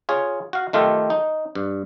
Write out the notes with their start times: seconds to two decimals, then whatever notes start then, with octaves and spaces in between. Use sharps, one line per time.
0.09 F4 G#4 C#5
0.53 F#4 F5
0.73 D#3 A3 F4 G4 A4
1.10 D#4
1.55 G2